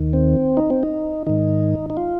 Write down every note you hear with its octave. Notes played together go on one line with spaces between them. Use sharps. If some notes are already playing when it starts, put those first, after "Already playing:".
Already playing: D#2 D#3
C4
D#4
C4
D#4
G#2 D#3 D#4
D#4
F4